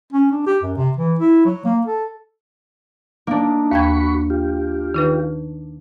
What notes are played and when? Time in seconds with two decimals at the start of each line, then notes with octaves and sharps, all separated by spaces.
0.13 C#4
0.32 D4
0.47 G4
0.63 F#2
0.77 C3
0.97 E3
1.19 E4
1.45 F#3
1.65 A#3
1.86 A4
3.27 A#3 D4 D#4
3.71 D#2 F#4 G5 B5 C#6 G#6
4.30 F4 G4
4.94 D#3 D#4 B4